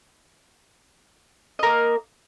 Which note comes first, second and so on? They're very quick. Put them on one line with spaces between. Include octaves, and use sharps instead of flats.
D#5 A#4 A#3